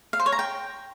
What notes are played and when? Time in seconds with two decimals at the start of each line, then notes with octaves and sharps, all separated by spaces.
0.13 F5
0.20 C5
0.26 C#5
0.32 A#5
0.39 G5